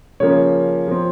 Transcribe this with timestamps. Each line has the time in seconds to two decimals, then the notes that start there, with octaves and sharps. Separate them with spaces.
0.20 C#3 F3 A#3 C#4 C#5
0.88 F3 C4